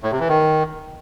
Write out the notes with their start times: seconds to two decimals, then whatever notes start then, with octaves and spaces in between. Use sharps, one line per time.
0.03 A2
0.11 C3
0.20 E3
0.28 D#3